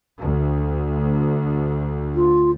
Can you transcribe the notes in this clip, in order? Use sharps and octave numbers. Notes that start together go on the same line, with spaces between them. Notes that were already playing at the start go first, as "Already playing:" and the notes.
D2
F4